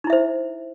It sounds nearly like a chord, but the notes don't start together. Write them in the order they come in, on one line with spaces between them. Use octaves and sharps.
D#4 E4 E5 C5